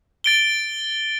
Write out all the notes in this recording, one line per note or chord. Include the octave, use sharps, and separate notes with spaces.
A6 D7 G7